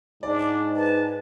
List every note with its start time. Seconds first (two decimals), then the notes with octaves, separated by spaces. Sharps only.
0.23 G#2 D4 D5
0.76 B4 A5